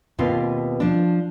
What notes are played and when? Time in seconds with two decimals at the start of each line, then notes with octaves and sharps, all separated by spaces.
0.19 D#2 B2 B3 C4 F4
0.80 F3 D4